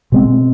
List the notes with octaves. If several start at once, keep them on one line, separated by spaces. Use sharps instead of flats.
B2 G#3 C4